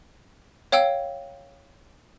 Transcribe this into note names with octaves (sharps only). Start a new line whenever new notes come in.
C#5 F5 G5 E6